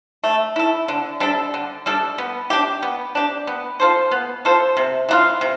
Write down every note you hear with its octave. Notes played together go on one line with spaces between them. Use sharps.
A3
E4 A4
D3
G3 D4 A4
D3
G3 D4 A4
B3
D4 G4
B3
D4 G4
B3
F4 A4 C5
B3
F4 A4 C5
C3
E3 B3 F4
C3